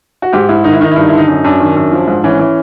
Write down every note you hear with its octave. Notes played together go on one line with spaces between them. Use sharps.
F#4
G#2 G4
G#2 E4
D#3 D#4
E4
D#3 D#4
E4
G2 D#4
E4
D3
D#4
F#2 D#4
F#2 D4
D#3
F#2
F3
G#2
E3 C#4
E3